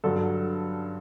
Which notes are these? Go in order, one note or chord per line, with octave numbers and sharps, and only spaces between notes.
G2 D3 F#3 A4